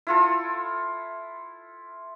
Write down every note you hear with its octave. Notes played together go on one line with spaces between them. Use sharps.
E4 F4 A4